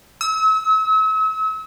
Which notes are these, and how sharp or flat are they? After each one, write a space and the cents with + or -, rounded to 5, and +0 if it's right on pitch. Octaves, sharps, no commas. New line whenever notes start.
E6 -40